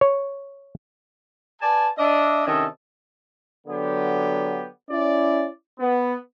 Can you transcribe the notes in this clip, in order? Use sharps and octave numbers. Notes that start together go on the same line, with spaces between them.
C#5
B4 D5 G#5 A5
D4 D#5 E5
C3 D#3 C#4 D4 A4 D#5
D3 F#3 B3 G4
C#4 E4 D5
B3